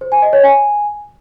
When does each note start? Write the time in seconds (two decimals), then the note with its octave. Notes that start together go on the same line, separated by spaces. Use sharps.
0.01 C5
0.12 G#5
0.22 D#5
0.33 C#5
0.43 G#5